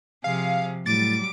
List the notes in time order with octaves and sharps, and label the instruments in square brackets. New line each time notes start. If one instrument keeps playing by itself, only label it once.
[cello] C3 F3 [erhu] G#4 [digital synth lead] F5
[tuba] A2 [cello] F#3 G3 [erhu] D6 [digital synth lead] A6